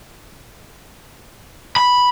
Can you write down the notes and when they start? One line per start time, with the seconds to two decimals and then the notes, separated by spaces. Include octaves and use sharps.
1.76 B5